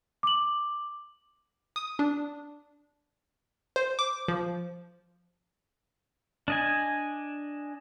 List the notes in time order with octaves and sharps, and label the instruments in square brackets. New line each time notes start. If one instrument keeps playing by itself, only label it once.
[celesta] D6 F#7
[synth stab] D#6
D4
C5
D6
F3
[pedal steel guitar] D4 D#5 G#5